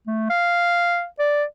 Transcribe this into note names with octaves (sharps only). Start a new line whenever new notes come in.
A3
F5
D5